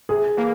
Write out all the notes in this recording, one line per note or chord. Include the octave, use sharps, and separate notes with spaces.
C3 G#4
E3 A#3